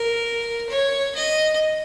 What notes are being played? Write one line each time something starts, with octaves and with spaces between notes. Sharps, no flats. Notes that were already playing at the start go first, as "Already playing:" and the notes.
Already playing: A#4
C#5
D#5